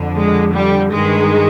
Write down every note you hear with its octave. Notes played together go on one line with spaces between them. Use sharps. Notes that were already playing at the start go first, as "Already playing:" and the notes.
Already playing: F2 D3
G#3
G3
G2 D#3 G#3